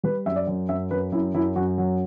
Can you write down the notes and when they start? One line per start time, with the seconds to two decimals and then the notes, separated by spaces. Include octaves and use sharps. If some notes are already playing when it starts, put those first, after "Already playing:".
0.03 G3 B4
0.26 F#2 E5
0.36 D5
0.47 F#2
0.69 F#2 E5
0.91 F#2 B4
1.12 F#2 E4
1.34 F#2 E4
1.56 F#2 F#4
1.78 F#3